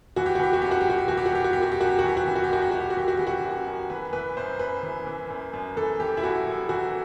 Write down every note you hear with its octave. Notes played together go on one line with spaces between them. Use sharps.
E3 F#4
G4
F#4
E3 G4
F#4
F#2 G4
F#4
G4
F#2 F#4
G4
E3 F#4
G4
F#4
E3 G4
F#4
F#2 G4
F#4
G4
F#2 F#4
G4
F#4
E3 G4
F#4
E3 G4
F#4
G4
F#2 F#4
G4
F#2 F#4
G4
F#4
E3 G4
F#4
E3 G4
F#4
F#2
F#2
E3 B4
E3 B4
F#2 C5
F#2 B4
E3
E3
F#2
F#2
E3 A4
E3 G4
E4
F#2 F#4
F#2
E3 F#4